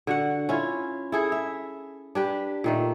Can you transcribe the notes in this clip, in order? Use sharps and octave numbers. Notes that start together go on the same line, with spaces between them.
D3 F#4 F#5
C#4 E4 F4
E4 G#4 A4
E5
D4 G4 B4
A#2 D#3 A3